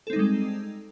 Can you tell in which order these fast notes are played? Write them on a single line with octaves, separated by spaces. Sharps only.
A4 C4 D#4 G3 G#3